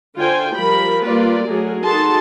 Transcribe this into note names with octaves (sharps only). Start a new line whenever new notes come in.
D3 F4 C5 G5 G#5
F3 G3 A#4 B5
G3 A#3 F4 B4 D5
F#3 A3 G#4 A#4
D#4 F#4 G#4 A4 A5 C6